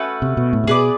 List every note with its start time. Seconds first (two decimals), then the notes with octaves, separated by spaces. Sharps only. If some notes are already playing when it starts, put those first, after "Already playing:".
Already playing: A3 C#4 F#4 B4
0.22 C3
0.37 B2
0.53 A2
0.64 C3
0.67 B2 G#4 B4 D5